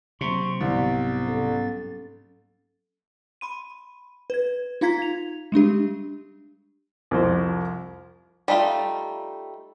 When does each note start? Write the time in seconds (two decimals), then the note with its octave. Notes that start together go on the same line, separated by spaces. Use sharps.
0.21 C3 F#3 A#3 C4 C6 C#6
0.61 C2 G#2 B3 A6
1.26 C#4 A4
3.41 B5 C6 D#7
4.30 B4 G#6
4.81 D#4 F4 F5 A#5 G#6 B6
5.02 F7
5.52 G3 G#3 D4 G4
7.11 C2 F2 C5
8.48 G3 A3 D#4 F4